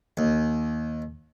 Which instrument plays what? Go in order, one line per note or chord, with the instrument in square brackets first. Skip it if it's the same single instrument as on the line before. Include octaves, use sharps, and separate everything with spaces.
[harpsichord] D#2